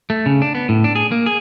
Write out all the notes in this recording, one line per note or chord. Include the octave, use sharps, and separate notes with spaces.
A3
C#3
D4
B3
A2
D4
G#4
A#3
G#4